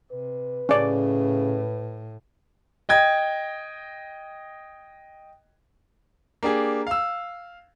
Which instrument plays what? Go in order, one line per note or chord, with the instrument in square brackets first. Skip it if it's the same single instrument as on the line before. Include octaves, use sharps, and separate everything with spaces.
[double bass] C3 [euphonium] B4
[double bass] A2 [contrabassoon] C#3 [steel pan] C#4 D5
[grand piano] D#5 G5 G#6
A#3 D4 G4 G#4
F5 E6